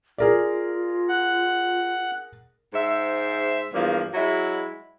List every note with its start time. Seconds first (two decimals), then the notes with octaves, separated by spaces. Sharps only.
0.18 F4 G#4 A#4 D5
1.09 F#5
2.73 G#2 C5 E5
3.73 E2 G2 F3 A#3
4.14 F#3 G#3 E4